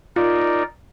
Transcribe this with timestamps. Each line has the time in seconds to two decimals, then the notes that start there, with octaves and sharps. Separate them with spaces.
0.16 D#4 F4 A#4 D5